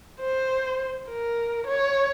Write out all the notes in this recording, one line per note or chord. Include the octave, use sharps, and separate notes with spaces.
C5
A#4
C#5